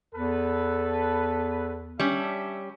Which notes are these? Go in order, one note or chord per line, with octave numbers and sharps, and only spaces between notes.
E2 A4 B4
G3 C#4 D4 E5